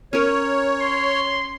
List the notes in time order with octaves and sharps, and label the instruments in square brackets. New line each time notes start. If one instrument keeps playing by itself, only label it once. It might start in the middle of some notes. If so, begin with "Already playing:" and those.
[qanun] C#4 A#4 [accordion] C#5
[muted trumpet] C6